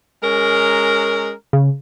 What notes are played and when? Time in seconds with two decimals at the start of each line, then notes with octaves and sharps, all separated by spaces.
0.23 G#3 C#4 A#4
1.53 C#3